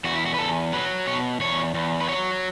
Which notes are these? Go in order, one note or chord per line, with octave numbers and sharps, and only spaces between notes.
E2 F#4
E4
F#4
B4
E2 A4
F#3 B4
B2 C#5
E2 C#5
E2
B4
F#3 C#5